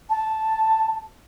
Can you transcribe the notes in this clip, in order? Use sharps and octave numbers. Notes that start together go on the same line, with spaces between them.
A5